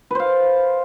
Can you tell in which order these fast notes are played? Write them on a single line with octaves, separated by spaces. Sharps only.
B4 C5 F5